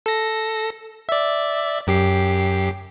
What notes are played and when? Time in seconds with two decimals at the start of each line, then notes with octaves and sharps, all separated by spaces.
0.06 A4 A#6
1.09 D5 E5
1.87 F#2 G4 C7